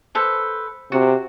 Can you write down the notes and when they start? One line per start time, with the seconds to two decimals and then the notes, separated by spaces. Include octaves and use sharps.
0.15 A4 B4 C5
0.92 C3 F#4